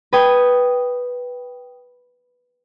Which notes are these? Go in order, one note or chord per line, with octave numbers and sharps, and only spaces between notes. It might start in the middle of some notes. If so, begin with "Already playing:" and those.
B4 G5 D#6 G#6